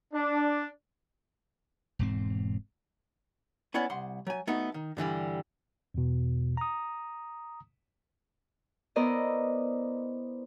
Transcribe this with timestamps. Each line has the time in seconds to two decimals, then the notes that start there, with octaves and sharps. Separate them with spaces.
0.13 D4
1.99 E1 G#2 C4
3.74 B3 C#4 E4 D5 F#5
3.90 C2 F#5 C6
4.27 F#3 G#5
4.47 A3 B3 D#4 F#4
4.74 D#3
4.97 G2 D3 E3 G3
5.94 E2 B2
6.57 A#5 D#6
8.96 B3 E4 A#4 C5 D5 D#5